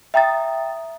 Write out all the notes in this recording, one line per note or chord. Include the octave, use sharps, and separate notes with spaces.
E5 G5 A#5 D#6 A6